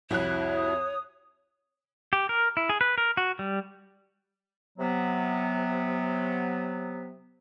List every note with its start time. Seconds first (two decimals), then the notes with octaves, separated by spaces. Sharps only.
0.11 C2 F2 E4 F#4 C#5 F#6
0.54 D#6
2.13 G4
2.29 A#4
2.57 E4
2.69 G#4
2.81 B4
2.98 A#4
3.17 F#4
3.39 G3
4.79 C3 F#3 B3